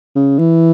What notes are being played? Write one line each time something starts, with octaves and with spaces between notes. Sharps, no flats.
C#3
E3